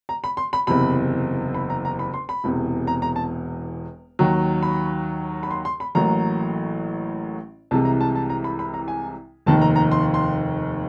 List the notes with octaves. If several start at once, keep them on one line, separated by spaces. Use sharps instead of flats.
A#5
B5
C6
B5
F#1 E2 C3 B5
B5
A#5
A#5
B5
C6
B5
E1 E2 C3
A#5
A#5
A5
D#2 D#3 F#3
B5
B5
C6
C6
B5
A1 A2 F#3 A#3 A#5
C2 C3 E3 G#3 A5
A#5
A5
A5
A#5
B5
B5
A#5
G#5
F1 D#2 D#3 A5
A#5
A#5
C6
C6